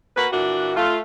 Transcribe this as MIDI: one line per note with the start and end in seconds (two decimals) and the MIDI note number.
0.17 0.26 58
0.17 0.26 66
0.17 0.26 71
0.32 0.72 46
0.32 0.72 52
0.32 0.72 62
0.32 0.72 66
0.76 0.97 57
0.76 0.97 65